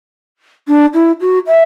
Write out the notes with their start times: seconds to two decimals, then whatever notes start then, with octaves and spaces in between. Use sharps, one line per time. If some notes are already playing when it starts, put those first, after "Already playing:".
0.68 D4
0.94 E4
1.21 F#4
1.47 E5